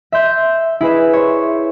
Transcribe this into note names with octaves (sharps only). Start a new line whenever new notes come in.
E5 C6 G6
E4 G#4 B4 E5
C5 C#5